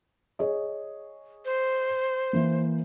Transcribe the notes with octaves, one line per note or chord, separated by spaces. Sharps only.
G#4 C#5 D#5
C5
E3 A#3